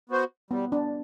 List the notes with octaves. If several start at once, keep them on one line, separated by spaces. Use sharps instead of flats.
B3 F#4 C5
G3 B3
D4